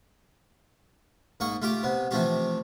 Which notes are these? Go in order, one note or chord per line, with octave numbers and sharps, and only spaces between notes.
G#2 A#3 C#6 D#6
A3 F4 G4 D6
C3 B3
C3 E3 F3 A3 C4 G4